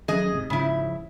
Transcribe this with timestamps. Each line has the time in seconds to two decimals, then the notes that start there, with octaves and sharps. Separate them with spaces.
0.08 D#3 F#3 C#4 G#4 D#5
0.32 F#1 G#2 C3
0.50 G#2 C#3 F3 E4